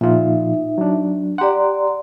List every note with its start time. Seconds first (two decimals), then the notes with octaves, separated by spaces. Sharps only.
0.01 A#2 F3 D#4 F4 E5
0.78 F#3 D4
1.38 G4 D5 F#5 A#5 C6